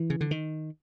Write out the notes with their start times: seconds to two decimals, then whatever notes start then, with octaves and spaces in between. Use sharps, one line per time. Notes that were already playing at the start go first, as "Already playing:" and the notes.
Already playing: E3
0.10 C#3
0.21 D3
0.31 D#3